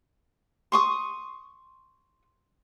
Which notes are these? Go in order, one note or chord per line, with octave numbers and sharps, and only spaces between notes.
C6 C#6 D#6